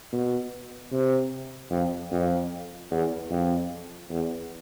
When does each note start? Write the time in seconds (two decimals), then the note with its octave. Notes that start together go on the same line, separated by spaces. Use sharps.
0.13 B2
0.93 C3
1.71 F2
2.12 F2
2.91 E2
3.31 F2
4.10 E2